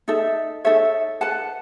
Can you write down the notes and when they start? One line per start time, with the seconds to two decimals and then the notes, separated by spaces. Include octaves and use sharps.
0.08 D#4 A4 E5
0.65 D#4 A4 C#5 E5
1.21 B4 F#5 A5